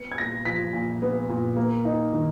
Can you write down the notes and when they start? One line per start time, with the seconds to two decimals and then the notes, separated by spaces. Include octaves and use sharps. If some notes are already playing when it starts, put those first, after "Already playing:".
Already playing: B3 C#7
0.12 G#6
0.18 A#2 A#6
0.45 F3 B6
0.73 A#2
1.02 B3
1.29 A#2
1.57 A#3
1.85 D#4
2.13 D#3